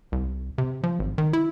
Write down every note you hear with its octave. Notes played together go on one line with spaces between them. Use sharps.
C2
C3
F3
G#1
D#3
E4